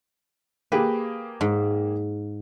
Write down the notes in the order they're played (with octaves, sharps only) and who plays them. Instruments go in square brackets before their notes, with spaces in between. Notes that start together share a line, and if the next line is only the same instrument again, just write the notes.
[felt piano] A#3 G4 G#4 [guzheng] B4
[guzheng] G#2